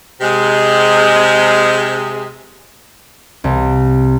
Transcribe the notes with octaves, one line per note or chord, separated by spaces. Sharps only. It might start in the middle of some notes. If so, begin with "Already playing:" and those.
C3 G#3
C2